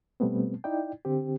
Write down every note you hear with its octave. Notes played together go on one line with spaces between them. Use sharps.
B2 G3 A3 B3 C4
D#4 E4 D5 G5
D3 C4 G4